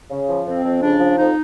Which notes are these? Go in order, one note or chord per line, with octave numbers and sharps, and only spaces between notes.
C#3
F3
F2 C4
F2
C#3 D4
F3
F2 D#4